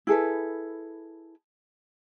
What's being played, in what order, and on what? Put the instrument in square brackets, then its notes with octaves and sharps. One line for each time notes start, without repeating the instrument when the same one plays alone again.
[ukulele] E4 G#4 A4 B4